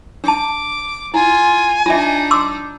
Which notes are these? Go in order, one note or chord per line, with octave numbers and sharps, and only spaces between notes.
D4 A5 D6
E4 F4 G#5
D4 D#4 F4 E5
C6 D6 E6